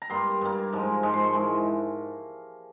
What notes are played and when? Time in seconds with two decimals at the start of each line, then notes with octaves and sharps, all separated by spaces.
0.02 A#5
0.10 G2 G3 A#3 C6
0.41 G2 G3 A#3
0.72 G#2 F3 G#3
1.03 G#2 F3 G#3
1.14 C6
1.24 C#6
1.33 E3 G#3 E4